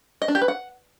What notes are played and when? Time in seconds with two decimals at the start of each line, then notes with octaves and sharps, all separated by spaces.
0.22 D#5
0.28 D4
0.35 G4
0.42 B4
0.48 F#5